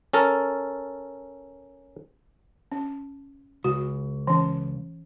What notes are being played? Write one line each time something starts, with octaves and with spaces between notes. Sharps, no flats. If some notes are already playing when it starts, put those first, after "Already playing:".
C#4 A4 A#4
C#4
C#2 F#4
E3 C#4